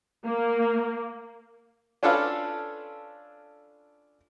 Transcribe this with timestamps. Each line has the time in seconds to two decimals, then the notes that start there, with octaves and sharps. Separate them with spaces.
0.24 A#3
2.03 C#4 D4 F4 A4 B4 F5